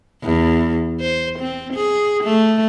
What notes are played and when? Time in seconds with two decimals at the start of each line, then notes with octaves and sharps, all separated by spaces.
0.23 E2
1.00 C5
1.39 C4
1.74 G#4
2.24 A3